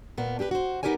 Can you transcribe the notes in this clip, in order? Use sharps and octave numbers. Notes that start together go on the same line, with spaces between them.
A#2 A#3 B3
D4 G4 G#4 B4
F#4 C5
B3 D#4 G4 A#4 C#5 G#5